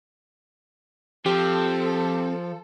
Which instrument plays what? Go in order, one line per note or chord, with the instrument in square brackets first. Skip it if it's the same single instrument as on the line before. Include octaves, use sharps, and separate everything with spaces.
[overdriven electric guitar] F3 [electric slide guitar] C4 [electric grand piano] G4 [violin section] A4